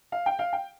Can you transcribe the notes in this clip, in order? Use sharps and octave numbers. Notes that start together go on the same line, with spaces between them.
F5
G5
F5
G5